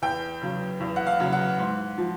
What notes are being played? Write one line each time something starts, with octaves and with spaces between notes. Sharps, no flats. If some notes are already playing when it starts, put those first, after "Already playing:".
E2 G5
C#3 F#3
E2
F#5
F5
C#3 F#3
F#5
G#2
F3